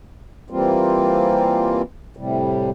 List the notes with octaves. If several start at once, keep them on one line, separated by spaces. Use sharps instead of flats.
E3 G3 A#3 C4 F4
A2 C3 G3